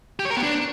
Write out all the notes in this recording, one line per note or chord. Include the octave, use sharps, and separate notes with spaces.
G4
C#5
A#4
B3
D4